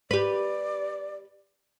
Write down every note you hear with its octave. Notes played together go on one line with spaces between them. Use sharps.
G4 B4 D5